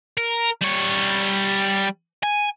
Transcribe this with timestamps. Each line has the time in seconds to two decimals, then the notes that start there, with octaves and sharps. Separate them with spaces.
0.18 A#4
0.61 G3 C#5
2.23 G#5